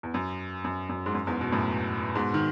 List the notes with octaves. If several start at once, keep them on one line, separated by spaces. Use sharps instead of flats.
E2
F#2
F#2
F#2
G#2
F#2
E2 G#2
B2
F#2 A2
G#2 B2
D#3